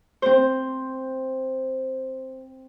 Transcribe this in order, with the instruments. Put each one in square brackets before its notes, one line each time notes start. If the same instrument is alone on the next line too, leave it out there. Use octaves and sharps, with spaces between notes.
[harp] C4 C5